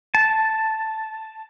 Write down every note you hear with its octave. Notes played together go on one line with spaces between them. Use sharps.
A5